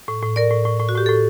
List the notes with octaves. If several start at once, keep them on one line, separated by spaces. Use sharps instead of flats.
A2
A2
A2 A#4 D5
A2
A2
A2
F#4
A2 G4
A2 A4